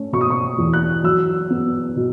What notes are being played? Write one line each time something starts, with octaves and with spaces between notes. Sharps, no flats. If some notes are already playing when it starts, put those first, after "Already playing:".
Already playing: A3 C#4
B2 C#6
D#6
C#6
E2
F#6
F#3 E6
B3
B2